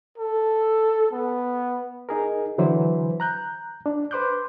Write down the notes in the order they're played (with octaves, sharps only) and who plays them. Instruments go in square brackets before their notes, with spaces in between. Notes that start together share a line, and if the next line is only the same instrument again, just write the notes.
[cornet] A4
B3
[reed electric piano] D#4 G#4 A#4
D3 E3 F#3 E4 B4 C5
A#5 F#6 G6
D4
B4 C5 C6 D6 F#6 G6